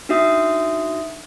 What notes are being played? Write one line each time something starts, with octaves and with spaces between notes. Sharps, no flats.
D4 D#4 F#4 E5 D#6